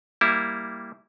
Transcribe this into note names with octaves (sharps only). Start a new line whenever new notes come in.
G3 A#3 E4